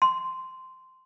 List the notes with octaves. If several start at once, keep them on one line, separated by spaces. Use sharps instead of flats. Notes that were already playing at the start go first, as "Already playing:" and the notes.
C6